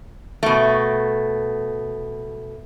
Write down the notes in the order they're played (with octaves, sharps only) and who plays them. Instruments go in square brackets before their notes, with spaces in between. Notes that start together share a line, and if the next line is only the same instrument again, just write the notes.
[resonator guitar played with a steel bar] B2 A3